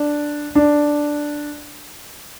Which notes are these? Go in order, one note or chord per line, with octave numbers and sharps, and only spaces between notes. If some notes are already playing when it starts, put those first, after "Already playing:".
Already playing: D4
D4